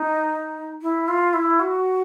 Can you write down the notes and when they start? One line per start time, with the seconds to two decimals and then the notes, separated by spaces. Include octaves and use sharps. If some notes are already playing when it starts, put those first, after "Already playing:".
Already playing: D#4
0.82 E4
1.08 F4
1.34 E4
1.60 F#4